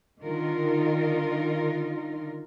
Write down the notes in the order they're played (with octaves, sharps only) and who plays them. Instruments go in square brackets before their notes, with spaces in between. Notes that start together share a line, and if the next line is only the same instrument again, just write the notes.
[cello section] D3 D#3 D#4 F4 A#4